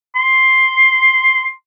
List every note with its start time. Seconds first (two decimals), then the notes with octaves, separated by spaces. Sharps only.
0.16 C6